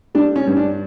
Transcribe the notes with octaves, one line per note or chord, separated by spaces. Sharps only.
G3 D4
C#4
G2
D4